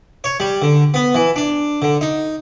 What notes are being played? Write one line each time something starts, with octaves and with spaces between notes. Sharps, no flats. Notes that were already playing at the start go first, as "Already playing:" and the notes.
C#5
G3
D3
B3
E3
D4
D3
D#4